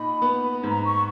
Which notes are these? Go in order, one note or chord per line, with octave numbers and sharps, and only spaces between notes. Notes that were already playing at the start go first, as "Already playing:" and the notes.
Already playing: A#2 D#4 B5
B3
G#2 A#5
C#6